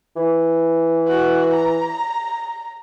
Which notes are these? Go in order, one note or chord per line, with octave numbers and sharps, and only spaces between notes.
E3
F#4
A#5